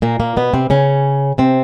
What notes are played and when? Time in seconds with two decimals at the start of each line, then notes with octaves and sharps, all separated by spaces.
0.02 A#2 A#3
0.20 A#2 A#3
0.36 B2 B3
0.54 C3 C4
0.70 C#3 C#4
1.38 C3 C4